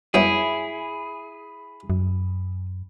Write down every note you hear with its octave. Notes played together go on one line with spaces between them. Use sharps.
F#2 B3 E4 G#4 G5
F#2